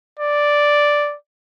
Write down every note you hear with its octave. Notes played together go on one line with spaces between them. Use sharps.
D5